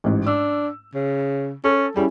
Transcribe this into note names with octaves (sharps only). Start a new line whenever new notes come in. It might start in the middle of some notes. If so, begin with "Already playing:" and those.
A1 G#2
D4 E6
C#3
C#4 A4
G3 C#4 E4 G#4